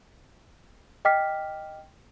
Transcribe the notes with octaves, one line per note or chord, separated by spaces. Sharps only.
D#5 G5 D6 F6 B6